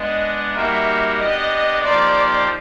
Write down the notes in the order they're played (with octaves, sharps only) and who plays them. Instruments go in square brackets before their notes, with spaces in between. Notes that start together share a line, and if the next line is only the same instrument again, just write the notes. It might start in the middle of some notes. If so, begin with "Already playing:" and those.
Already playing: [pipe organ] G#3 B3 D4 [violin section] D#5
[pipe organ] G3 A#3 D#4 F#4 A#4 [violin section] E5
[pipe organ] B3 D4 G4 [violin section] D#5
[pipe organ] F3 A#3 D#4 G4 C5 [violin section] D5